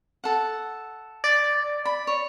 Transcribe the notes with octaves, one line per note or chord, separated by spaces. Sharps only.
A4 F#5
D5
B5
C#5